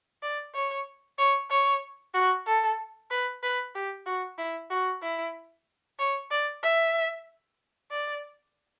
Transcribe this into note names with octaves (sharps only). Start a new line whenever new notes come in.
D5
C#5
C#5
C#5
F#4
A4
B4
B4
G4
F#4
E4
F#4
E4
C#5
D5
E5
D5